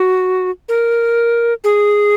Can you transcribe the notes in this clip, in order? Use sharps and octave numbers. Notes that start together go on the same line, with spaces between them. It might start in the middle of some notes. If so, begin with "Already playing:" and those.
Already playing: F#4
A#4
G#4